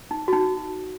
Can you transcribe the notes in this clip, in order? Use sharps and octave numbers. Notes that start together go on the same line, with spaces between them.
D#4
F#4
D#4